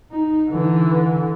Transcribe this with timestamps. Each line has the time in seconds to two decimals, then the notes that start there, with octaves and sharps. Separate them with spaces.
0.11 D#4
0.50 D3 E3